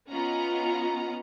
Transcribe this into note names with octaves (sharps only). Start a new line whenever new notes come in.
B3 C#4 F4 D#5 F#5 A#5